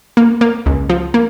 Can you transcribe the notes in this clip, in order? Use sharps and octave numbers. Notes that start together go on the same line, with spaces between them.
A#3
A#3
C#2
F3
A#3